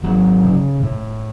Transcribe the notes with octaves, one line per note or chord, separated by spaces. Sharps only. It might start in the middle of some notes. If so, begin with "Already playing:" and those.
G#1 F#3
C#3
A2